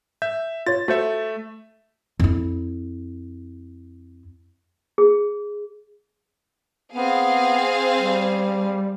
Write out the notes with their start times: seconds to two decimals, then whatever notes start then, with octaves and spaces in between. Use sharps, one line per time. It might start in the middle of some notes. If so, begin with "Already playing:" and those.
0.22 E5 G6
0.66 F4 C#5 A6
0.88 A3 F#4 C5 E5 C#7
2.20 F2 E4
4.98 G#4
6.94 B3 C4 G#4 F5
7.96 G3